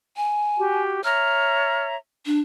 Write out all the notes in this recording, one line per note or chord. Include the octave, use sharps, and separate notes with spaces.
G#5
F#4 G4
C#5 E5 A#5 F6
D4